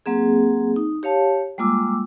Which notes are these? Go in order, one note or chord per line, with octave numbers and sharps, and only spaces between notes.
F#3 A#3 C4 G#4
D#4
G4 C#5 F5 A5
G3 G#3 A#3 F4 D6 E6